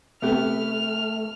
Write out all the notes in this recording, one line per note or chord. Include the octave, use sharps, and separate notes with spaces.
C3 A3 B3 G4 F6